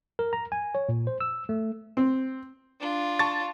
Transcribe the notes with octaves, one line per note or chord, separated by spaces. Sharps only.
A#4
A#5
G#5
C#5
A#2
C5
E6
A3
C4
D4 F4
A5 C#6 A6